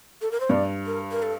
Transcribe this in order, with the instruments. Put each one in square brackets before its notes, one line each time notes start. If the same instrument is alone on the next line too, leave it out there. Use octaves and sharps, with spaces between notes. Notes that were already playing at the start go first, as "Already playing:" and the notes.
[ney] A4
A#4
C5
[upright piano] G2 [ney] D5
[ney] A#4
A#4
A4